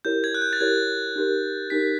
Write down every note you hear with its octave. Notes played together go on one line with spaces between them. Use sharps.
E4 G4 A#4 C#5 G6
G#6
F#6
G6
A6
E4 G4 A#4 C#5 G#6
D#4 G4 A#4
D#4 G4 A#4 B6